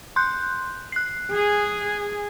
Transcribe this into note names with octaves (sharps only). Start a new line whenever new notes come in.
C6 F#6 G6
F#6 C7
G#4